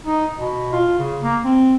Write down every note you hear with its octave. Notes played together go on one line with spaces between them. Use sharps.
D#4
B2
F4
C#3
A#3
C4